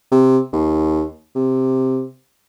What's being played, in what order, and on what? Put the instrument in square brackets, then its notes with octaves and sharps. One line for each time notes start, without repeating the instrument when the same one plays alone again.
[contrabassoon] C3
D#2
C3